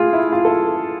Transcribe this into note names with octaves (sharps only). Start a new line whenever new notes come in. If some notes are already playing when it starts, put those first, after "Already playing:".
Already playing: A3 F4 G#4
E4
F4
A4